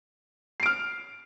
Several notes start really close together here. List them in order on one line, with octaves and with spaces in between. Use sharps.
C7 D7 F6